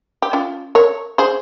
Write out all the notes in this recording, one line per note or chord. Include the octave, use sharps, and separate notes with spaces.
G4
C#4 F4
A#4 C#5
G#4 C5